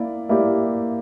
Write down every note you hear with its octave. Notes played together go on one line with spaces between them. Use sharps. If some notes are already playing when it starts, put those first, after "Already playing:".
Already playing: A#3 E4 D5
A#3 E4 G4 D5